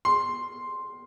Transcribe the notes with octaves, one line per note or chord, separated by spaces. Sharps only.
C6